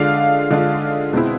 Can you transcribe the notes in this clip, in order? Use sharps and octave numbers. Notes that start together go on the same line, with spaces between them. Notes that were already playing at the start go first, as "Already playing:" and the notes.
Already playing: D3 G#3 D4 F4 F5
D3 G#3 D4 F4
B2 G#3 C4 E4